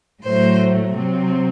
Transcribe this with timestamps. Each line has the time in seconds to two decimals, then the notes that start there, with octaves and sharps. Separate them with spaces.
0.23 A2 F#3 A3 C5
0.94 C3 F#3 C4